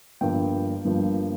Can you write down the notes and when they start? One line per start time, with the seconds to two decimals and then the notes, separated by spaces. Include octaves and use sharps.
0.21 G1 G2 F3 A#3 G5
0.85 G1 G2 F3 A#3